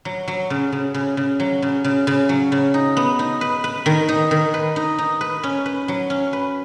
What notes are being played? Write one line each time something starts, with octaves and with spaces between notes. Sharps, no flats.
F#3
F#3
C#3
C#3
C#3
C#3
F#3
C#3
C#3
C#3
F#3
C#3
D#4
B3
D#4
B4
B4
D#3
D#4
D#3
B4
D#4
D#4
B4
C#4
B4
F#3
C#4
B4